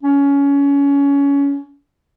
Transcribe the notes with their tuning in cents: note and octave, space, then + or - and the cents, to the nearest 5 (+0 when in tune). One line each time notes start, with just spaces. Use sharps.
C#4 +20